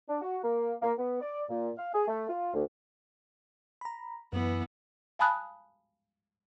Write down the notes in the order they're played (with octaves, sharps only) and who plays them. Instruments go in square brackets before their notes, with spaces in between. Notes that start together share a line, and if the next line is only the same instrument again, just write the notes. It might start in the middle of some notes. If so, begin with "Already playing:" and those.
[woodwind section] D4
F#4
A#3
A#3
B3
D5
A#2
F5
G#4
A3
F4
D2
[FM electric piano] A#5 B5
[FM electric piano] F#2 [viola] E3 B3
[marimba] F5 G#5 A5 B5 D#6 F#6